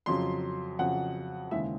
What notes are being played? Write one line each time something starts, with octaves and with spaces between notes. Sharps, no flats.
F2 C#3 F#3 C6
F2 C#3 F#3 F#5
D#2 C#3 E3 G#3 E5